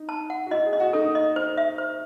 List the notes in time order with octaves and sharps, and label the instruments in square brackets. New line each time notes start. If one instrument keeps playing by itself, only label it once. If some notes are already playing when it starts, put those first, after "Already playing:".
Already playing: [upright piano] D#4
[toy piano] A5
F#5
[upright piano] F#4
[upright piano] E4 [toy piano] D#5
[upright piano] G#4
[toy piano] D#5
[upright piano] F#4
[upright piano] D#4 [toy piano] A4
[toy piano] D#5
C5
E5
C5